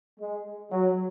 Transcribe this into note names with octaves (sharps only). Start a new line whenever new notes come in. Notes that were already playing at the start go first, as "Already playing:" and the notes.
G#3
F#3